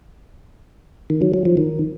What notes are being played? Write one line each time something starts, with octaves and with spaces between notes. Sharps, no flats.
D#3
F#3
F#3
F3
D#3